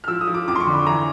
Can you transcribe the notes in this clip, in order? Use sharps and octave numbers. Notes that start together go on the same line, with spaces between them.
F6
F3 E6
D#6
F3
D6
F2 D6
C6
C#6
D3
B5
E3 A#5